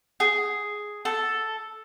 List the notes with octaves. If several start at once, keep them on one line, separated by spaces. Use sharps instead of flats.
G#4
A4